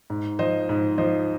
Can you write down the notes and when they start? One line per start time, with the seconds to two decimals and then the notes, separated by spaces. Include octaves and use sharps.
0.10 G#2
0.39 F3 C5 D#5
0.69 G#2
0.98 F3 C5 D#5